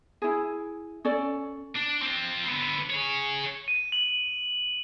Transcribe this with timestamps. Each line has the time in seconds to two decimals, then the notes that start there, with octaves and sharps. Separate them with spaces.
0.22 E4 G#4
1.05 C#4 A4 D5
1.75 D4
2.02 C4 F4
2.47 D3 B3
2.90 G#4 C#5
3.68 D#7
3.92 F#7